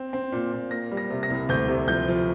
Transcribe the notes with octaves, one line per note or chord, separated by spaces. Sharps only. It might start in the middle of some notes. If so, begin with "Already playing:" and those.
Already playing: C4
C4
A#2
A#2
A#3 A#6
G3
A#6
C3
A#6
C2
D2 G6
C3
F3 G6
F3